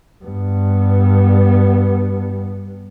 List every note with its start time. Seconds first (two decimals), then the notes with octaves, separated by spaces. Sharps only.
0.24 G2 B3